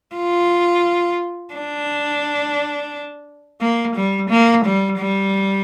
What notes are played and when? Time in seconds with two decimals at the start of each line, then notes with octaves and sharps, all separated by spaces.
0.15 F4
1.54 D4
3.61 A#3
3.95 G3
4.30 A#3
4.65 G3
4.99 G3